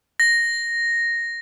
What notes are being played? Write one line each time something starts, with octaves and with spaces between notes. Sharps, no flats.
A#6